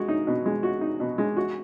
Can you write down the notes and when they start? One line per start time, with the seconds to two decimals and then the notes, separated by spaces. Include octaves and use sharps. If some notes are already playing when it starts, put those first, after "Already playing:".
Already playing: G#3 F#4
0.08 D#4
0.27 B2
0.46 G#3
0.63 F#4
0.81 D#4
1.00 B2
1.18 G#3
1.36 F#4